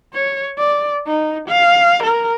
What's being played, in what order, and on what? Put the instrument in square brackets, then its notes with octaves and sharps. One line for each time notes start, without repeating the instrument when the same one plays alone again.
[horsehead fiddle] C#5
D5
D#4
F5
A#4